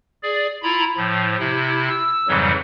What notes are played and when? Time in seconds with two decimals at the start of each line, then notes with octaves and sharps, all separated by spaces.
0.23 G#4 D5
0.63 E4 F4 A#5 B5
0.97 A2 F3
1.39 C3 E4
1.89 E6
2.28 F2 G#2 C#3 E3 F#3 G3